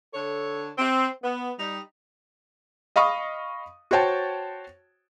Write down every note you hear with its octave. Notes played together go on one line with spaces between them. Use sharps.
D3 A4 C#5
C4
B3
G3 D#4
D#5 F5 B5 C#6 D#6
F#4 C5 C#5 G5 A5